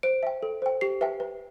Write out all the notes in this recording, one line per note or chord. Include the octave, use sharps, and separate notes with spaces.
C5 D7
E5 G5
A4
C5 G5
G4 C7
B4 E5 G5
B4